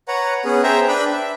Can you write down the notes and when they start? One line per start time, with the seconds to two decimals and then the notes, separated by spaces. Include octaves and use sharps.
0.08 B4 C#5 F#5 A#5
0.45 B3 C#4 G#4
0.64 G#4 C5 E5 G5 A#5
0.88 D4 B4 G5 B5
1.12 E5